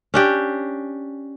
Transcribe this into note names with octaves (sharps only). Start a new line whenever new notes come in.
C#4 D4 G4